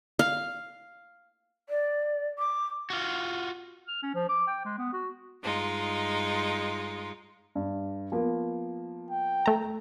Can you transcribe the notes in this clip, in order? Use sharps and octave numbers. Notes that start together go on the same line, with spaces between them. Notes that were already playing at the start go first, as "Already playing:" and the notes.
F5
D5
D6
F4 F#4
F6
C#4
F3
D6
G5
G#3
B3
F#4
G2 G#3 D#4 F4
G2
F3 A#3 B3
G5
A3 A#5